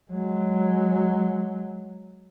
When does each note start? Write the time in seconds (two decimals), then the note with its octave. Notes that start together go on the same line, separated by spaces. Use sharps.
0.11 F#3 G#3